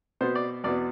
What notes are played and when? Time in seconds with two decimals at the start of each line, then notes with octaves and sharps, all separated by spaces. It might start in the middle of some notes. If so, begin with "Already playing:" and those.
0.21 B2 B3 C5
0.35 D5
0.64 E2 B2 B3 D5